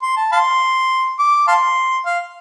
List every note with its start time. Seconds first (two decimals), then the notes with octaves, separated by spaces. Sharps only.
0.03 C6
0.17 A5
0.32 F5 A5 C6
1.19 D6
1.48 F5 A5 C6
2.06 F5